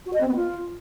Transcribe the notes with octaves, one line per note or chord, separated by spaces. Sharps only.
F#4
D#5
C4
B3
F4